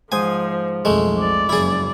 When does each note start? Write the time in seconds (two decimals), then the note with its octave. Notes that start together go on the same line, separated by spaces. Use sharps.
0.12 G#2 F3 C5 G#5 D#6
0.85 B1 F2 G#3 A3
1.20 D5
1.49 F#1 E4 G#4